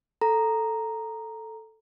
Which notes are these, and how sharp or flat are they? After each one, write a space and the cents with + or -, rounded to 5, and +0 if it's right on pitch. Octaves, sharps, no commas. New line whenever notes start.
A4 +0 A#5 +0